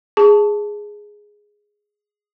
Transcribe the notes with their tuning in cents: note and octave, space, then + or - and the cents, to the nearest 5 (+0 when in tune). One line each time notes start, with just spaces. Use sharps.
G#4 +0 A5 +0 C#6 +30